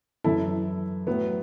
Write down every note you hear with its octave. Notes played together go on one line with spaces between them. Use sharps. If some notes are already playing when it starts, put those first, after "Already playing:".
F#2 E3 E4 A4
A2 F#3 B3